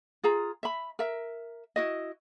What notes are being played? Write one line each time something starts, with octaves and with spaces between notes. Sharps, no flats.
F4 G#4 A#5
E5 B5
A#4 E5
E4 F#4 D#5